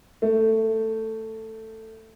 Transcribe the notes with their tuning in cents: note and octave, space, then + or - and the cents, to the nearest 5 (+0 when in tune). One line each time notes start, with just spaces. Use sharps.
A3 +15